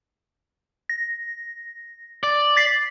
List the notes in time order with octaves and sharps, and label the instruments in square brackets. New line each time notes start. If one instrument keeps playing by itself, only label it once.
[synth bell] A#6
[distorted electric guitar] D5
[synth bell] A6 B6 C7